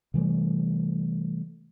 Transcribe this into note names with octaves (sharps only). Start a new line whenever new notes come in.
C3 E3 G3 A3